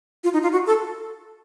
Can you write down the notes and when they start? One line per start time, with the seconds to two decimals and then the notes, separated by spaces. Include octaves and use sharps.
0.24 F4
0.33 D#4
0.43 F4
0.52 F#4
0.67 A4